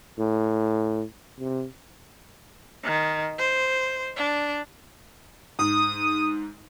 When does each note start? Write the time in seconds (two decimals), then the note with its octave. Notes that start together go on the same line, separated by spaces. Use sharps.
0.18 A2
1.40 C3
2.84 D#3
3.38 C5
4.17 D4
5.59 G#2 D#6